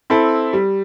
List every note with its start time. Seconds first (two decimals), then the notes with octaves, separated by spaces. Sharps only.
0.10 C4 E4 A4
0.53 G3